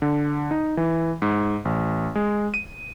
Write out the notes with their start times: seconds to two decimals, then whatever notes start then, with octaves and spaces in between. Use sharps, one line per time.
0.02 D3
0.51 D#4
0.77 E3
1.22 G#2
1.65 A1
2.15 G#3
2.54 D#7